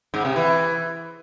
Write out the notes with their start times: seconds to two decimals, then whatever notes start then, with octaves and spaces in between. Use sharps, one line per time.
0.14 G#2
0.25 C3
0.36 E3